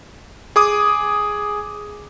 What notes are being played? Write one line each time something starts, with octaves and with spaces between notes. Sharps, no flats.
G#4 D6 D#6